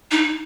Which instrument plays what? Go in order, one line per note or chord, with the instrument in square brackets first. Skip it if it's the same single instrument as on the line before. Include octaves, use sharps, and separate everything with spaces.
[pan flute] D#4